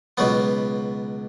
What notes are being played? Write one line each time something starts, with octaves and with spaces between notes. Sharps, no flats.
C#2 B2 F#3 B3